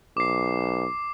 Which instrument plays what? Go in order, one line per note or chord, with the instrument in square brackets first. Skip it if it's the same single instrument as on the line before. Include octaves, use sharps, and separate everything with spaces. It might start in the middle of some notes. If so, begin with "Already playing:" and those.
[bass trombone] B1 [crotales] D6 C7